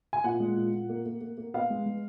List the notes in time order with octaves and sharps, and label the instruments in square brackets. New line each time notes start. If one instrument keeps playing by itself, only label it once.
[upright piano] G#5
A#2 F#5
G#3
A#2
A#2
A#3
A#3
A#3
A#3
B3 F5
G#3
G#3